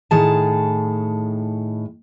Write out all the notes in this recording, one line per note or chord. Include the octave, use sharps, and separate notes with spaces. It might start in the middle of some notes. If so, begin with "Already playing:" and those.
A2 D#3 G#4 A5